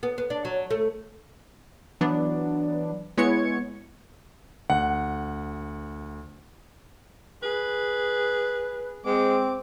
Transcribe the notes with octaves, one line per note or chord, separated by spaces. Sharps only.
B3
B3
D4
F#3
A3
E3 F#3 B3 D4
G#3 B3 E4 C#5 G#6 C#7
D2 F#5
G#4 B4
G#3 C4 D6